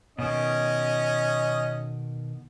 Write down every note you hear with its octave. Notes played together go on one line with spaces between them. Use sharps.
B2 D#3 C#4 D#5